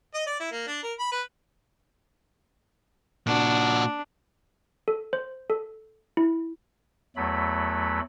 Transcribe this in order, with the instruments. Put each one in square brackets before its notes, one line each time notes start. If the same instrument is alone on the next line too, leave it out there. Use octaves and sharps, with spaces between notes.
[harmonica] D#5
D5
E4
A#3
D4
A#4
B5
B4
[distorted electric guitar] A#2 F#4 [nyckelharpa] D4
[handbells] A4
C5
A4
E4
[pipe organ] E2 F#3 A3 B5